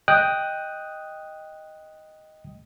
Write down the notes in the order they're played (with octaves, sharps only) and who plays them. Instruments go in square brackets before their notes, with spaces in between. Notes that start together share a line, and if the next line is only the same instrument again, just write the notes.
[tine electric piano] D#5 G5 D#6 F#6